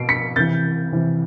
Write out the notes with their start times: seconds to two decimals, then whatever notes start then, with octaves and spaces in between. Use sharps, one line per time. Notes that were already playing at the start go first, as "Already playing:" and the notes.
Already playing: B2 C7 D7
0.09 B6 C#7
0.36 C3 E3 G6 A6
0.92 C3 E3